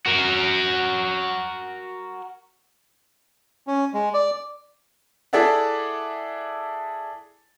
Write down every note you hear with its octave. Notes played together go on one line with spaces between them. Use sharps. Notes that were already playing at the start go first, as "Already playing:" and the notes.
F#4 A#4
C#4
G#3
D5
E4 G#4 A4 D5 E5 F#5